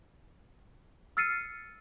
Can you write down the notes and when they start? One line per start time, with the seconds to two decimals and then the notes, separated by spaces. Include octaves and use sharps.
1.17 E6 F6 A6 C7 C#7 D#7